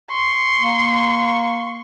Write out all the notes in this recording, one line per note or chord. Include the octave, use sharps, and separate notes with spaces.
C6 C#6
A#3